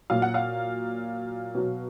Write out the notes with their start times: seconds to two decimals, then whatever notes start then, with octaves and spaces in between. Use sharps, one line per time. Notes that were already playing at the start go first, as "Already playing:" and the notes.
0.10 A#2 F#3 F5
0.22 F#5
0.34 F5
1.55 B2 F#3